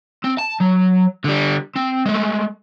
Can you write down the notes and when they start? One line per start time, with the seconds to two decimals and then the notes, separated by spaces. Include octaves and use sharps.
0.24 C4
0.39 A5
0.61 F#3
1.25 D3 G3
1.76 C4
2.06 G#3 A3